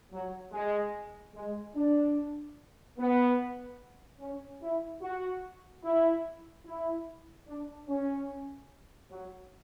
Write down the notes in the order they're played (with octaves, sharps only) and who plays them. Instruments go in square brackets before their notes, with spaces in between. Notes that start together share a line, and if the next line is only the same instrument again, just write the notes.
[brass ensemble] F#3
G#3
G#3
D4
B3
C#4
E4
F#4
E4
E4
D4
C#4
F#3